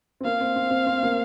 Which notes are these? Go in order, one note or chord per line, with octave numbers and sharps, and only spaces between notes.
C4
A#3 F5
C4
C4
C4
C4
A#3